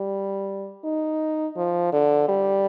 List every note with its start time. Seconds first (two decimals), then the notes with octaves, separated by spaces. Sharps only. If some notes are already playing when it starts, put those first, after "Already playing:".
Already playing: G3
0.84 D#4
1.56 F3
1.93 D3
2.28 G3